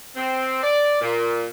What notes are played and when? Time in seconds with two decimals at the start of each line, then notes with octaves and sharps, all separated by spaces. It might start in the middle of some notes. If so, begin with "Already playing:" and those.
0.17 C4
0.63 D5
1.00 A#2